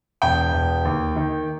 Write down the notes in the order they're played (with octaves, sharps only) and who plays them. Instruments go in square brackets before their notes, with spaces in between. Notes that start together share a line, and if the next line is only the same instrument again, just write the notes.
[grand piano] E1 G5
E1
D#2
D#3